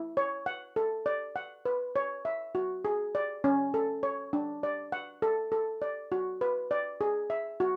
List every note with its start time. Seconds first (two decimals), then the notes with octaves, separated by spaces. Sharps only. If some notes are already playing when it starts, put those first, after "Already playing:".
Already playing: E4
0.17 C#5
0.46 F#5
0.76 A4
1.06 D5
1.36 F#5
1.65 B4
1.96 C#5
2.25 E5
2.55 F#4
2.85 G#4
3.15 D5
3.44 C#4
3.74 A4
4.03 C#5
4.33 D4
4.63 D5
4.92 F#5
5.22 A4
5.52 A4
5.82 D5
6.12 F#4
6.41 B4
6.71 D5
7.01 G#4
7.30 E5
7.60 F#4